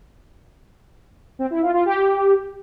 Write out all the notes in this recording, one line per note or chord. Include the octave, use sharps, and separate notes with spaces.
C4
E4
F4
F4
G4